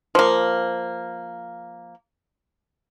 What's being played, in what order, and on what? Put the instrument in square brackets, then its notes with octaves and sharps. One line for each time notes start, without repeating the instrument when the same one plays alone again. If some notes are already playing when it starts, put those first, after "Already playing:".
[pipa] F3 A#3